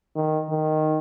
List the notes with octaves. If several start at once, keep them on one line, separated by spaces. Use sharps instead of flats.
D#3
D#3